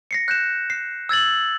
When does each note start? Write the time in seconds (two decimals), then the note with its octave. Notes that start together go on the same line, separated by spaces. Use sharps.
0.11 A#6 C7 C#7
0.28 F#6 G6 E7
0.70 C7
1.09 E6 G#6 A6 F#7